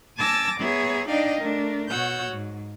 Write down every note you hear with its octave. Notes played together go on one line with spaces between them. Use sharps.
G#5 A5 D6 E6 A6 A#6
B3 G#4 C#5 E5 A#5
D4 D#4 D5 D#5 F5 G5
A3 D4 A#4
B2 F#4 C#5 F#5 E6 G6
G#2